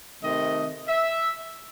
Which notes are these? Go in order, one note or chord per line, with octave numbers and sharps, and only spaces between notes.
C3 D#3 A3 D#5
E5